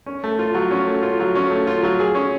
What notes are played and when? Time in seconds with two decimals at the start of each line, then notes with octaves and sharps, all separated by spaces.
0.06 C#4
0.24 A3
0.39 F4
0.54 F#3
0.71 C#4
0.87 A3
1.03 F4
1.20 F#3
1.35 C#4
1.51 A3
1.67 F4
1.83 F#3
2.00 G#4
2.15 C#4